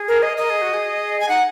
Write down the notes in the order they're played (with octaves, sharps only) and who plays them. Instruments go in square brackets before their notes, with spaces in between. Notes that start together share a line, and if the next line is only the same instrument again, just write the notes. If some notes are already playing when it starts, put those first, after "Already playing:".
Already playing: [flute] G#4
[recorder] A#4
D#5
[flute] A#4 [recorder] D#5
[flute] G#4
F#4
G#4
[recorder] G#5
[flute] D#4 [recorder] F#5